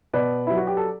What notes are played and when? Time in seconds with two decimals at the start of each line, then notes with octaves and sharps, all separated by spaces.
0.13 B2 B4 D5
0.47 F#3 E4
0.57 F#4
0.67 G4
0.77 A4